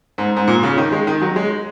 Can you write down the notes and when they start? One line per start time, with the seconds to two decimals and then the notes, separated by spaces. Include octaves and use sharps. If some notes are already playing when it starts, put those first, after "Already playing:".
0.18 G#2
0.37 G#2
0.48 A#2
0.63 C#3
0.77 D#3
0.92 G#3
1.07 D#3
1.22 F#3
1.36 G#3